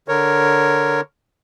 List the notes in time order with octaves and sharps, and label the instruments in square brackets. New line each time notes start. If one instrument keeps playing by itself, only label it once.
[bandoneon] D3 A#4 C#5